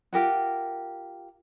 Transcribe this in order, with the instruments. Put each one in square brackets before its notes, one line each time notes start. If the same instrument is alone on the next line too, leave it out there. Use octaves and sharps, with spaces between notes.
[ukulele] F4 G4 A#4 F#5